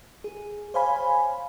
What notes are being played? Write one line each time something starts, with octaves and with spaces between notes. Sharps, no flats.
G#4
C5 C#5 F5 G#5 B5